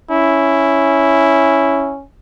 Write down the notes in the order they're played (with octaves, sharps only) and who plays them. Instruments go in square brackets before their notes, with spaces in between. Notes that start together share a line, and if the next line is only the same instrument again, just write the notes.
[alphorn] C#4 [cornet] E4